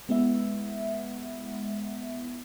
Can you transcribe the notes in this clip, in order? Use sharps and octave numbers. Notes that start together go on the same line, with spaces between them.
G#3 B3 E4 E5